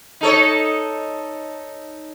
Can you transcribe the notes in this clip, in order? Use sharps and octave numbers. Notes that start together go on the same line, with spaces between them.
D#4 A4 C#5